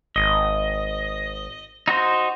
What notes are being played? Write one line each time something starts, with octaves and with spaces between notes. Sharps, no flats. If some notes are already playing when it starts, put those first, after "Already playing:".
G#1 D#5
D#4 F#4 C5